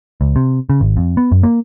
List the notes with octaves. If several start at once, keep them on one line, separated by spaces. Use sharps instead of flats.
C#2
C3
C#3
G#1
F2
B3
F#2
A#3